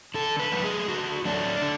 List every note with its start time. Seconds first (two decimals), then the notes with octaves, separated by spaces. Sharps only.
0.14 D3 A4
0.39 B4
0.52 F#3 A3
0.64 G#4
0.88 D3 F#4
1.25 F#3 A3 D4
1.62 D3